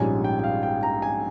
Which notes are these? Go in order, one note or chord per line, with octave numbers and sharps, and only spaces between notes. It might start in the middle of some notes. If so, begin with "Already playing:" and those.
Already playing: A#1 G#2 G3 C#4 F4 G#5
G5
G5
F5
G5
A#5
G#5